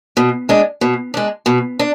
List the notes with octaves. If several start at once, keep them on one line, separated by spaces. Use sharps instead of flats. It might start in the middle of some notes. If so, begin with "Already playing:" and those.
B2
G#3 D4
B2
G#3 D4
B2
D4